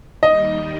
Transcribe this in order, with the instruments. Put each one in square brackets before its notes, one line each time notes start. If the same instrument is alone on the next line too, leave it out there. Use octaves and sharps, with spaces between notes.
[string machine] D#2 D#3 G3 [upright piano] D#5